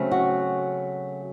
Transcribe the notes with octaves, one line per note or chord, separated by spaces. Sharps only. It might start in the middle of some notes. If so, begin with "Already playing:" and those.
Already playing: C#3 F#3 A3 C4
F#4